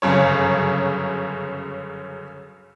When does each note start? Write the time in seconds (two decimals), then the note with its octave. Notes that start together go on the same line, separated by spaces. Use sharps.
0.02 G1 F#2 C#3 C#5